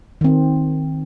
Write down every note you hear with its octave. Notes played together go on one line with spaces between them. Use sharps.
D#3 C4